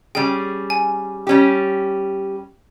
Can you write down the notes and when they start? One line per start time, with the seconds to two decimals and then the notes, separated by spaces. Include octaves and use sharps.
0.15 G3 C#4 G#4 G5
0.70 G#5
1.27 G3 C#4 G4